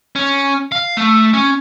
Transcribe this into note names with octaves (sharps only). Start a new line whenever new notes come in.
C#4
F5
A3
C#4